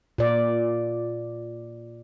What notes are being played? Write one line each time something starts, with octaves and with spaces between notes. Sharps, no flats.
A#2 D5